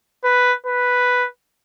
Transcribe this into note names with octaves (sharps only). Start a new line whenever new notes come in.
B4
B4